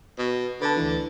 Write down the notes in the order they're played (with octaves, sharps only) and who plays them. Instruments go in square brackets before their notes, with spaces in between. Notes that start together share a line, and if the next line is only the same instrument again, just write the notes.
[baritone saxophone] B2
[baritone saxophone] D3 [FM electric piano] B4 A5
[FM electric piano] D2 E3